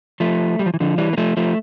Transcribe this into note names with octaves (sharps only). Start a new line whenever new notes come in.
F3 A3
G3
F3
E3
D3 F3
E3 G3
A#3
F3 A3
F3 A3